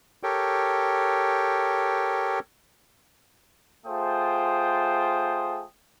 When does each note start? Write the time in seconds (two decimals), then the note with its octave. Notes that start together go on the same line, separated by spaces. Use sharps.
0.23 G4 A4 A#4 C#5 G5
3.86 A3 F4 G#4 C5 G5 D#6